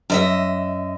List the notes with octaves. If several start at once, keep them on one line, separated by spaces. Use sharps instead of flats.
F#2 D#5 E5